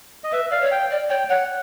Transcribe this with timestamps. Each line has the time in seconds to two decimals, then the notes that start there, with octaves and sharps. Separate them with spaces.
0.24 D#5
0.32 B4 E5
0.50 D5 F5
0.61 C#5
0.72 G5
0.91 D5
1.10 C#5 G5
1.30 C#5 F#5